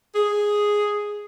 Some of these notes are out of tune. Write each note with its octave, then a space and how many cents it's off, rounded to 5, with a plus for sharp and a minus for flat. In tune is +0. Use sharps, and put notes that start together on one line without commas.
G#4 +0